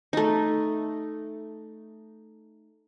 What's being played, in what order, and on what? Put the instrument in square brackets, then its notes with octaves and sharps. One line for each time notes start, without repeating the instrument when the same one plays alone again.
[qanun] A3 D#4